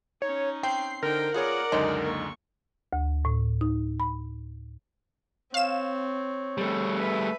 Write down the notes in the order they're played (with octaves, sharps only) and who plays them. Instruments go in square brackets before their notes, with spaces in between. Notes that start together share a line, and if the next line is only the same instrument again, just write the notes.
[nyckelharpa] C#4 D#4 [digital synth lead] C#5
[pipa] C4 [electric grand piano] G5 [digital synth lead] C7
[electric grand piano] D3 D#4 [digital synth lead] A#4 [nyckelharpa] C5 G5
[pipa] B3 [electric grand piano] F4 G#4 C#5 [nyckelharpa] D5 F#5
[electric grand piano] C#2 F#2 D3 [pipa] G#3 D#4
[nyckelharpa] A#3 C#6
[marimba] D2
A2
D#4
B5
[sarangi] C4 [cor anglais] C#5 [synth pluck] F5 E7
[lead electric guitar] G3 A3
[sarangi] B4 [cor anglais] E5